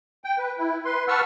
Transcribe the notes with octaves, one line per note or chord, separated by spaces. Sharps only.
G5
B4
E4
B4 C6
B4 F#5 A5 C#6 E6 F6